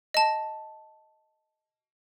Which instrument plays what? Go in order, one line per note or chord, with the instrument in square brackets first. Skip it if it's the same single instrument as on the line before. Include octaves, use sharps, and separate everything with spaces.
[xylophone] D#5 A5